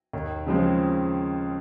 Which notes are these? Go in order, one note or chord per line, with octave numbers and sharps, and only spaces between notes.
D#2
C#3 F3 G#3 C4